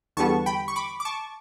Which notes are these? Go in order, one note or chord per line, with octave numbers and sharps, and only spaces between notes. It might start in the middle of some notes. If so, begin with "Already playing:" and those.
E2 D3 G3 B3 A5 C#6
G5 B5
C#6
B5 D6
D6
A5 C#6